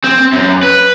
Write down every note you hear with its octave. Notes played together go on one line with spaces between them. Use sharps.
C4
F#2
B4